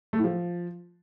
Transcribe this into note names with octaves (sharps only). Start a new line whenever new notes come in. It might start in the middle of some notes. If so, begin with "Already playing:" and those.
A3
A2
F3